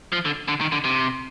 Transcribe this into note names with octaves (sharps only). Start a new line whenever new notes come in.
F3
D3
D3
D#3
D3
C3